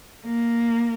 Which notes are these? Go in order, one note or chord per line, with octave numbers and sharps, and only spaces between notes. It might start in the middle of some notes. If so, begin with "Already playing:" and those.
A#3